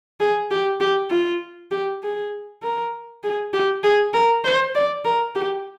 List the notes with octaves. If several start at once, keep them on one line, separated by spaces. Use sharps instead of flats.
G#4
G4
G4
F4
G4
G#4
A#4
G#4
G4
G#4
A#4
C5
D5
A#4
G4